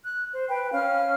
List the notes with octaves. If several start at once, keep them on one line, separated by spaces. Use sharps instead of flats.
F#6
C5
B4 G5
C#4 F5 F6